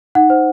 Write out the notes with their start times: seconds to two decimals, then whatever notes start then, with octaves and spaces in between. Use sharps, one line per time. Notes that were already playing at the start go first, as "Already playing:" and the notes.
0.15 D#4 F#5
0.30 C5